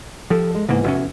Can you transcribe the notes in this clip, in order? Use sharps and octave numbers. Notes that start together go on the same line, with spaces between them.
F3 G4 A4
G#3
G#2 C#3 E3 A#3 B3
F1 E2 C#4 F#4 E5